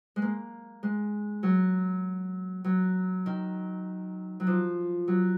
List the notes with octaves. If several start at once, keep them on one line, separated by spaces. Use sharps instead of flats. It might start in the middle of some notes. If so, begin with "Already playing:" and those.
G#3
A#3
G#3
F#3
F#3
D#3
F#3
F3
F#3